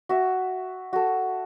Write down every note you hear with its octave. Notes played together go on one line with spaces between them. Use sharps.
F#4 E5
F#4 A4